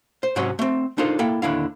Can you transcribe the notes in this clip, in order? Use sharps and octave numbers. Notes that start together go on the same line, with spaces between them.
C5
G#2 C3 F#3 C4 C#4 C6
A3 C4
D4 D#4 F4 A4 A#4 C5
A#3 E4 A4 G5
D#2 D3 E4 F5